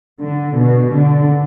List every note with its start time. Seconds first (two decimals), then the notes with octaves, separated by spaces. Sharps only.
0.22 D3
0.57 B2
0.93 D3